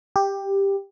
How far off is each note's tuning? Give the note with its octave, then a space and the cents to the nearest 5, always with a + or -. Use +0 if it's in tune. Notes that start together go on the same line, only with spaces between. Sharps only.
G4 +10